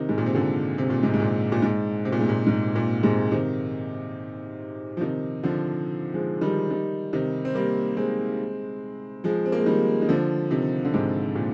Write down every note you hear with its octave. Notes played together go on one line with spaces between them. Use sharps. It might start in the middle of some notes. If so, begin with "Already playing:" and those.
Already playing: C3 D#3
G#2
A#2
C3
A#2 D3
C3
A#2
G#2 C3
G#2
A#2
A#2
G#2
C3
A#2
G#2
A#2
G#2
A#2
G#2 C3
C3 D#3
F3
C3 D#3
D3 F3
F3 G#3
D#3 G3
D#3 G3
C3 D#3
C4
G3 A#3
G#3 C4
F3 G#3
C4
A#3
G#3
D#3 G3
D#3
D3 F3
C3 D#3
D3
G#2 C3
A#2